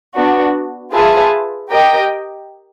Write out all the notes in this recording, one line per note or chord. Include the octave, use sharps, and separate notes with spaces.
B3 D4 F#4
F4 G#4 B4 E5 A5
G4 A#4 D#5 G5